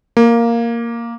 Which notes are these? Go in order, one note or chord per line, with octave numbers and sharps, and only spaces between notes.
A#3